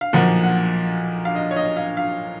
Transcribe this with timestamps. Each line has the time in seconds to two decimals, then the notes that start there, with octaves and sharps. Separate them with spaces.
0.01 F5
0.13 B1 A#2 F3 A#3 F#5
0.43 F#5
1.25 F5
1.35 D#5
1.51 C#5
1.56 D#5
1.77 F5
1.97 F5